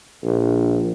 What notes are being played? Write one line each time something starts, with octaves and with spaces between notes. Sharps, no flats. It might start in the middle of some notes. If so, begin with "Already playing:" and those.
A#1